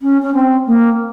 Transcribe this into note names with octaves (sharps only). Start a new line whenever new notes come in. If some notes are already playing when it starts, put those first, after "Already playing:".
C#4
C#4
C4
A#3